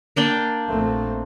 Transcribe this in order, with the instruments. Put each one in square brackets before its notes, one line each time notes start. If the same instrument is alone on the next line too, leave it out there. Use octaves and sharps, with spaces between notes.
[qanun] A#3 D4 G5
[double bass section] A#1 A3 C4